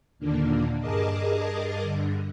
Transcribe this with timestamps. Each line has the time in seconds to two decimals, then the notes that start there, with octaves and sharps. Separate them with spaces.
0.19 D#2 A#2 D3 A#3 D4
0.79 G2 G#4 A#4 D#5 A5 D6
1.82 G2 D3